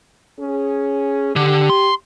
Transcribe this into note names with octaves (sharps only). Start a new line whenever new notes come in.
C#4 G#4
D3 G4
C6